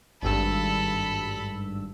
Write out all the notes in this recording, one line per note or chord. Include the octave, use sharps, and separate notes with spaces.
G#1 G2 A4 B5 E6